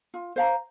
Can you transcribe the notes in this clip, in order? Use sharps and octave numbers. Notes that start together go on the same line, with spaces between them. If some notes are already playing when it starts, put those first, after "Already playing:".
F4
C5 F5 A#5